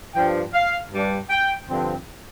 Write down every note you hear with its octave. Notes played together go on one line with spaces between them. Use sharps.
G2 F3 D4 G5
F5
G2 G3 D4
G5
G2 D3 F3 C4